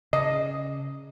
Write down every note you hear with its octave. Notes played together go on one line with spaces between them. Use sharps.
C#3 D#5